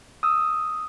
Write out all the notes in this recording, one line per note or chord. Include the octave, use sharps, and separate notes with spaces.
D#6 E6